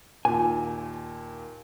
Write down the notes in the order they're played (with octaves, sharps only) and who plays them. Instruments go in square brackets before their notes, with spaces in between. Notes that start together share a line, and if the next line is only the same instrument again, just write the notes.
[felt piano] D#2 A#2 [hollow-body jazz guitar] G#5